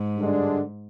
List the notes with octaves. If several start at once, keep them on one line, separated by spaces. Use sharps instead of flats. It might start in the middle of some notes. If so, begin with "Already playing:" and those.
Already playing: G#2
G2 D3 G#3 D4